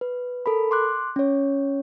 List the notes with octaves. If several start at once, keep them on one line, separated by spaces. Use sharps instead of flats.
B4
A4 A#4 B5
C6 D6 F#6
C#4 C#5